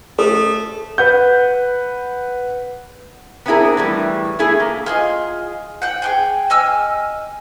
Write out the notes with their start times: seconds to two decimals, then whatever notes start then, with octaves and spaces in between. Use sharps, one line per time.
0.19 A3 A4
0.98 B4 F#5 G6
3.46 B3 C4 D4 E4 G#4 A#4
3.77 A2 E3 G3
4.39 A3 B3 E4 G#4
4.60 A#3
4.86 F4 G#4 D#5
5.82 F#5 G5
6.02 G#4 G5 G#5
6.50 D#5 G#5 E6 F6